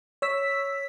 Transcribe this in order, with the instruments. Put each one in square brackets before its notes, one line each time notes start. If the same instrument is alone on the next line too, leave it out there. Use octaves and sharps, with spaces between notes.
[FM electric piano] C#5 E6 B6